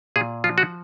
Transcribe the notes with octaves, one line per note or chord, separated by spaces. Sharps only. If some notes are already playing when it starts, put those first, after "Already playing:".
A#2 G#4
F3 F4
F#4